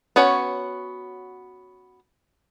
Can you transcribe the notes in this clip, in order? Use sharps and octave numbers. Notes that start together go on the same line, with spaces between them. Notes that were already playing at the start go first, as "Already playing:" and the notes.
B3 C#4 F#4 C#5